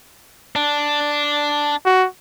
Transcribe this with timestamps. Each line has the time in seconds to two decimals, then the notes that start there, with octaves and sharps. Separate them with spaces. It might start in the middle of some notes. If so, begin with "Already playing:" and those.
0.56 D4
1.85 F#4